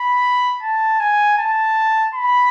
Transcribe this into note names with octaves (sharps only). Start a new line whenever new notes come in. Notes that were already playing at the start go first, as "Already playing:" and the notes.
Already playing: B5
A5
G#5
A5
B5